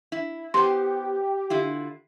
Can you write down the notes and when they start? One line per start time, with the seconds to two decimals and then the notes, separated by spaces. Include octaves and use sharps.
0.12 E4
0.54 B3 G4 C5 C6
1.50 D3 E4 F4